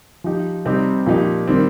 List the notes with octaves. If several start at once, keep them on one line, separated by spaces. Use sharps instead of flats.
F3 D#4 G4
C3 G3 C4 D#4 G4
A#2 F3 D#4 G4
D#3 G3 C4